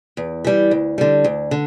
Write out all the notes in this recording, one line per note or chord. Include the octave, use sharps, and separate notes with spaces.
E2
E3 G3
D2
D3 G3
D2
D3